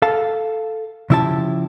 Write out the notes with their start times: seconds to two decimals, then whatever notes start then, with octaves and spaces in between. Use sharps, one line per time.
0.02 A4 F5 A5
1.10 C#3 F3 E4 G4 C#5 A5